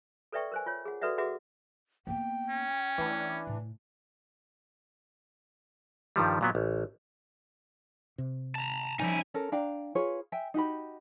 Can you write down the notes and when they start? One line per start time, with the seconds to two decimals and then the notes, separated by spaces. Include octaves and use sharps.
0.32 A4 B4 D5 E5 G5 C#6
0.52 A#4 C5 G#5
0.66 F4 C#5
0.85 G#4 F#5
1.01 F#4 A4 B4 D5 E5 F#5
1.18 F#4 G#4 B4 E5 F#5 D6
2.07 A#3 B3 G5
2.50 C#4
2.98 E3 A3 D4
3.47 A2
6.16 G2 D#3 F3 G3
6.41 A#2 F#3 B3
6.55 A1
8.18 C3
8.55 A5 A#5
9.00 F3 G3 C#4 D#4 E4 G#5
9.34 C#4 A4 A#4
9.52 D4 F5 G5 A#5
9.95 F4 G#4 B4 C#5
10.32 E5 G5 G#5
10.54 D#4 F#4 G4 B5